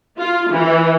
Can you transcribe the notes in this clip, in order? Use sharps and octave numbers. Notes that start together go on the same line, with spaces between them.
F4
E3